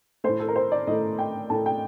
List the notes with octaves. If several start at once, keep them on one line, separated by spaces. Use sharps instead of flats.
A2 A3 C5
A4
A#4
C5
D5
A2 A3 D#5
G5
A2 A3 A5
G5